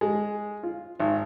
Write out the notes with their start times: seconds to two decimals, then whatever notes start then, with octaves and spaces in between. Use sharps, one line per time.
0.01 G#3
0.63 F4
1.00 G#1